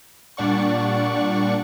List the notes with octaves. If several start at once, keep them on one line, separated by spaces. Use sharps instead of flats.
A#2 G3 D4 D5 F#5 C#6